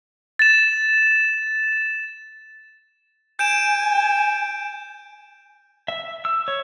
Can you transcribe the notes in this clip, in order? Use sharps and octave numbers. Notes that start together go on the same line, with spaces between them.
A6 E7
G#5 G6 D7 E7
E5
E6
C#5